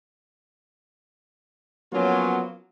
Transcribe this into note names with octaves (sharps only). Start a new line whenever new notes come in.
F3 F#3 A#3 B3 C#4 F4